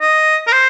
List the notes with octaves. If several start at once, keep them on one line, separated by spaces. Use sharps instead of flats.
D#5
A#4
C5